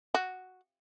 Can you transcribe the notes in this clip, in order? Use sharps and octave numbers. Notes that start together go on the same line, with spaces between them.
F#4